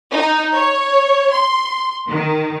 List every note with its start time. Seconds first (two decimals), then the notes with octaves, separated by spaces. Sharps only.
0.12 D#4
0.55 C#5
1.32 C6
2.09 D#3